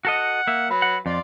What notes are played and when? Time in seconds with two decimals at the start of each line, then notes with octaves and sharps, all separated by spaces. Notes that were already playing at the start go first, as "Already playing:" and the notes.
0.05 F#4 A4 D#5 F#5
0.47 A#3 E5
0.70 F#3 B4
0.82 F#5
1.06 F2 F4 D5